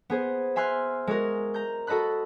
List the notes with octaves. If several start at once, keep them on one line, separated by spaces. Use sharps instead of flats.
B3 G#4 C5
E5 G#5 C6 F6 F#6
G#3 F#4 A#4
A#5 G6
F#4 A4 D#5 B5 F#6